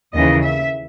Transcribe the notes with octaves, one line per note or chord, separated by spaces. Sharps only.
D#2 C#3 E3 D#5
E5